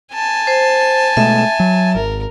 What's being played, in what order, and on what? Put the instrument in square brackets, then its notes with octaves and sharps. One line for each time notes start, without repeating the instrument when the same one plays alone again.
[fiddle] G#5 A5
[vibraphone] C5
[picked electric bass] B2 G#3 A3 [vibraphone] E5
[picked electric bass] F#3
[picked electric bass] G#1 [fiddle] A#4